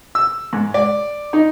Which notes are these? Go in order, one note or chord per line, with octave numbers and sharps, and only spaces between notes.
E6
G#2
D5
D#4